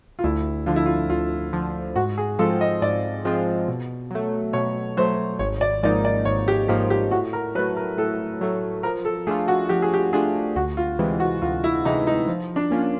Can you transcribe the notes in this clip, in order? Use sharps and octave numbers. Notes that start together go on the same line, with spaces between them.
F4
D2 E4
D3 F3 F4
E4
F4
D2 F4
D3 F3
G#2 F#4
G#4
F3 G#3 C4 F4 A4
D#5
G#2 D5
F3 G#3 C4 F4
B2
F#3 A3
B2 C#5
F#3 A3 C5
G#1 C#5
D5
G#2 F3 A#3 D#4 D5
D5
G#1 C#5
G4
G#2 F3 A#3 D#4 G4
G4
A2 F#4
A#4
F#3 A3 B4
A#4
A2 A4
F#3 A3
F3 A#4
A4
A3 D4 F4 G#4
F#4
F3 G4
G#4
G4
A3 D4 F4 G#4
D2 F#4
F4
C3 E3 G#3
F#4
D2 F4
E4
C3 E3 G#3 D#4
D#4
F3
D4
A#3 C#4 F4